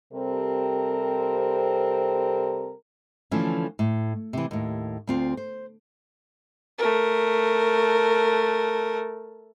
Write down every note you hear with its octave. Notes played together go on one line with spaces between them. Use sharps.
C3 G3 C4 A4 A#4
D3 E3 F3 A3 C#4
A2
C3 E3
D#2 A2
D2 C4 F4
C5
A3 A#4